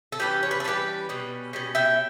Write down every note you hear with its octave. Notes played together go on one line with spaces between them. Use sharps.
A4
E3 G3 C#4 G4 B4
C#5
B4
A4
E3 G3 C#4 G4 B4
B2 G3 C#4
B2 G3 C#4
E5 G5